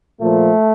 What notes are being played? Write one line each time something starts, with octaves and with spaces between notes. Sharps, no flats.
A#2 F3 A3